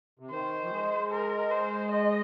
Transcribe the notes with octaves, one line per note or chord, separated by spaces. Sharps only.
C3
D#3 C5
F3
G#3
A#4
C5
D#5